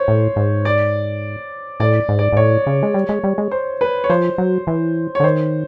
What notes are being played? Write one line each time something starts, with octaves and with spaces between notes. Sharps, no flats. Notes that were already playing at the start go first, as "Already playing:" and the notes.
Already playing: C5 C#5
A2
G#2
D5
A2 D5
G#2
D5
G#2
A2 C#5
C#3
G#3
G3
G#3
G3
G#3
C5
B4
C#5
F3 C5
F#3
E3
C#5
D3
D#3 C5